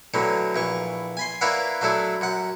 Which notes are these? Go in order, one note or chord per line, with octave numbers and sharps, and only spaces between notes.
A2 D3 E3 F#3
A#1 E3 C#6
G#5 B5 C6
A#3 E4 B4 C#5 D5 F#5
F#3 A3 D4 E4
F#2 F#5